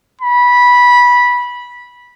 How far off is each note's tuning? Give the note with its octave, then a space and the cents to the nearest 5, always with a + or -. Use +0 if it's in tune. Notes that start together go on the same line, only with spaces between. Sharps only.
B5 -15